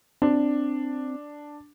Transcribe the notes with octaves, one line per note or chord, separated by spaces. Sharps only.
C4 D4